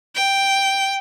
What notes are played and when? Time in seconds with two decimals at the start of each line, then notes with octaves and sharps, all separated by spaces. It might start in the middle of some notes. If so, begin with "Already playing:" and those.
0.15 G5